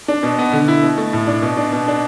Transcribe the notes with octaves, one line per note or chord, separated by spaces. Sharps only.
D4
B2
B3
D3
E4
B2
A3
A2
D4
B2
D4
B2
D4